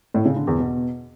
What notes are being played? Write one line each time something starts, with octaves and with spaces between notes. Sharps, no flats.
A2
C#3
D3
E2
B2